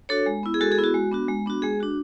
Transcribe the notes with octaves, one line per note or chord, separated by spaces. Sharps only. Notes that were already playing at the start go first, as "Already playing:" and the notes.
D4 F#4 A4 C#5
G#3
B3 E4
G#4
G#3 F#4 A4
G#4
B3 E4
F#4
G#3
B3 D4 F#4
G#3
B3 D4 F#4
G#3 G#4
D4 F#4